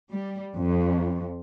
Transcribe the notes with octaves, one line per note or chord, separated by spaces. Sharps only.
G3
F2